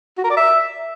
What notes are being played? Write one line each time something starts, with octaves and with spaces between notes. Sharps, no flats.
F#4
A#4
D5
E5